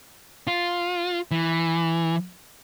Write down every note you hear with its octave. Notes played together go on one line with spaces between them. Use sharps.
F4
E3